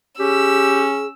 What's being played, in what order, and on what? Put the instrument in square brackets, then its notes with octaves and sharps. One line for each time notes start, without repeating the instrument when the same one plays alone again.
[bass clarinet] C#4 [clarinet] G4 [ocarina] G#4 [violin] E6